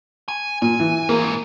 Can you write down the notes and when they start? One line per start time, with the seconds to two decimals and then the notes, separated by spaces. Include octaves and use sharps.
0.28 G#5
0.62 A#2 G#5
0.80 E3
1.09 G#2 E3 A#3